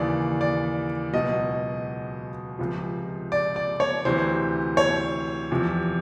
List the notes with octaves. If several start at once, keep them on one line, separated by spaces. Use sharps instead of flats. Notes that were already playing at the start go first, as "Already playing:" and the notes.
Already playing: D#2 C#3 E3 D5
D5
C#2 B2 F#3 D#5
C#2 C3 F3
D5
D5
C#5
D2 C3 E3 C5
C#5
E2 C3 F3